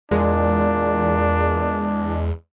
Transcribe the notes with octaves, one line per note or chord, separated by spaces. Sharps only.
E2 A#2 G#3 D4